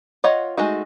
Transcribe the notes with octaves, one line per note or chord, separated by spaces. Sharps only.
F4 C#5 D#5 F#5
G#3 A3 D#4 F#4